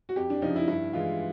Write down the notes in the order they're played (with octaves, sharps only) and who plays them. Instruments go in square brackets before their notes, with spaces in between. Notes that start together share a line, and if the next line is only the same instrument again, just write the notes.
[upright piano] F#4
F2 G4
D4
C#3 F3 D#4
E4
G2 E4
E3 G#3 F4